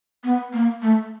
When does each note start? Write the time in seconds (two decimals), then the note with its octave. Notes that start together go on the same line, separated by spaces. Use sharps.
0.24 B3
0.53 A#3
0.82 A3